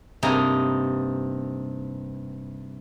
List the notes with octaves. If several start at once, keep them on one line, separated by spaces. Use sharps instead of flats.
G2 C3 A#3 D#4 G#5 A#5